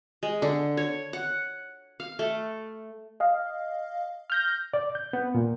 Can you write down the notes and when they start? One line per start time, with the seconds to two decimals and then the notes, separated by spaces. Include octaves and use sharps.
0.23 G#3
0.42 D3
0.77 C#5
1.13 F#5
2.00 F5
2.19 A3
3.20 D#5 F5
4.30 F6 G6 A#6
4.74 D5
4.95 G6
5.13 B3
5.35 A#2